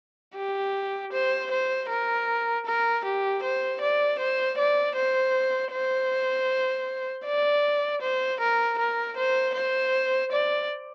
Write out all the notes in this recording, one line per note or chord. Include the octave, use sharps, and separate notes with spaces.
G4
C5
C5
A#4
A#4
G4
C5
D5
C5
D5
C5
C5
D5
C5
A#4
A#4
C5
C5
D5